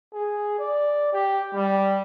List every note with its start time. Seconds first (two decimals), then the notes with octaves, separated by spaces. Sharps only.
0.13 G#4
0.59 D5
1.13 G4
1.54 G3